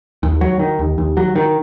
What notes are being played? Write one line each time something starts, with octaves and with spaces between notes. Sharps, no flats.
D#2
F#3
D#3
D#2
D#2
F#3
D#3